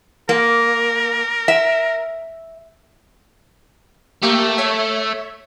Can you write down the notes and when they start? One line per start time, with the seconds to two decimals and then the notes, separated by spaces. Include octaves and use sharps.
0.29 A#3 A#4
1.48 E5
4.23 A3 A#3 G4
4.58 C#5 E5